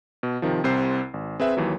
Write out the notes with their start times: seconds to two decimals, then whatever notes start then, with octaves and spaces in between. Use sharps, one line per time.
0.23 B2
0.42 C3 D#3 F3
0.64 C2 C3 C5 C7
1.14 G#1
1.40 C4 G#4 B4 E5
1.57 D#2 E3 F#3